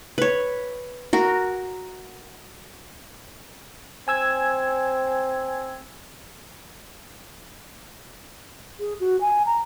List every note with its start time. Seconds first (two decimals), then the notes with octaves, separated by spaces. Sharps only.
0.18 B4 C#5
1.13 F#4 A#4
4.08 C4 G#5 E6 G#6
8.80 G#4
9.00 F#4
9.21 G#5
9.46 A#5